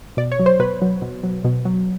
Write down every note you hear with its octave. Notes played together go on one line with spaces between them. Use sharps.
B2 D5
C#5
F#3
C5
B2 B4
F#3
B2
F#3
B2
F#3